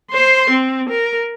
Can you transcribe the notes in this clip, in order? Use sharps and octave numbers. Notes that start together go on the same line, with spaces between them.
C5 C6
C4
A#4